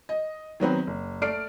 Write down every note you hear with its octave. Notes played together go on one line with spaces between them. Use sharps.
D#5
D#3 F#3 B3 C4
F#1
A3 D5 F6 C7 D7